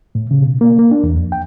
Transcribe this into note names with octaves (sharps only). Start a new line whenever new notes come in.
A2
C#3
B2
A#3
A#3
D4
E2
F2
G5